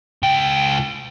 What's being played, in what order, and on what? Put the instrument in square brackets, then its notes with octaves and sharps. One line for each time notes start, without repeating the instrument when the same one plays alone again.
[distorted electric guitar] C#2 G5